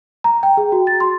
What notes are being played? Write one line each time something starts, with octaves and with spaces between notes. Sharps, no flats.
A#5
G5
G#4
F#4
A6
C6